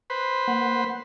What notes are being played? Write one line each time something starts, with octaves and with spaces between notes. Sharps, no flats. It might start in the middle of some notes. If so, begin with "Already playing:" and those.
B4 C5
A#3 F#5 F#6